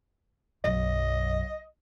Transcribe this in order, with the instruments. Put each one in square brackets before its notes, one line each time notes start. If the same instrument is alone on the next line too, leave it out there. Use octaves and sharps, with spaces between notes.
[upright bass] B1 F#2 [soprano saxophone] D#5